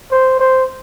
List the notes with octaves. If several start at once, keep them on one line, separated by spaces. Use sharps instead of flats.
C5
C5